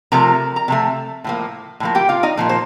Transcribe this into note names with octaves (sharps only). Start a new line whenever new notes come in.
C3 F3 A3 A#4 A#5
A#5
C3 F3 A3
A2 F3 A#3
A2 F3 A#3
G4 G5
F4 F5
D#4 D#5
A#2 F3 A#3
C5